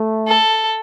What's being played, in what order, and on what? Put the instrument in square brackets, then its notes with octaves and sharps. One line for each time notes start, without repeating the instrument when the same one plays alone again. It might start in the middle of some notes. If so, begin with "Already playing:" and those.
Already playing: [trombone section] A3
[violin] A4